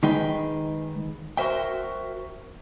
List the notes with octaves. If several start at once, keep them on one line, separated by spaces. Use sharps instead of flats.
D#3 G#3 D#4 G#4 B4 G5
F#4 A#4 C5 E5 G5